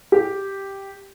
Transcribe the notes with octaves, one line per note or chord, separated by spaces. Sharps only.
G4